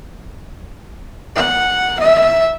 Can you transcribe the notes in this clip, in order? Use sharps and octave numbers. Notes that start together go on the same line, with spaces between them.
F#5
E5